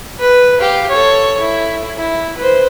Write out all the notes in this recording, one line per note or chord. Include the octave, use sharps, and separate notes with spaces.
B4
G4 F5
A4 C#5
E4
E4
B4 C5